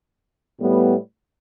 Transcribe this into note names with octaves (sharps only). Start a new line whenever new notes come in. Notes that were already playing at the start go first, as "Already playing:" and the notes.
A2 G3 B3